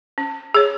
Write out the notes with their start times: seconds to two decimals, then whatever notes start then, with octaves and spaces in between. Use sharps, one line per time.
0.18 C#4
0.54 G#4 C#5